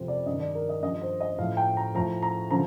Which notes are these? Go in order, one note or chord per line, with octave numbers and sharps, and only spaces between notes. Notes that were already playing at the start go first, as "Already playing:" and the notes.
Already playing: F2 C3 F3 C5
D5
G2 D#3 D#5
D5
A#4
D#5
G2 F3 D#5
C5
D#5
A2 F3 F5
G5
A#5
A2 F3 A#5
A#5
D3 F3 A#5